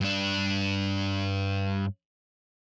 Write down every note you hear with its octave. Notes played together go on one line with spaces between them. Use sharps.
G2 D4